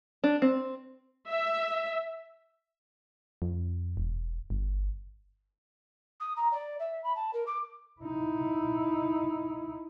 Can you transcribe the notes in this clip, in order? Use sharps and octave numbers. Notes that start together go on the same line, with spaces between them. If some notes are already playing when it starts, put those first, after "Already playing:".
D4
C4
E5
F2
E1
G1
D#6
A#5
D5
E5
B5
A5
A#4
D6
D#4 E4